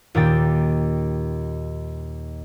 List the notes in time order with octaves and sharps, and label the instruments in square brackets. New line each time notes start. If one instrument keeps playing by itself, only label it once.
[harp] D#2 A#2 D#3 G5 A6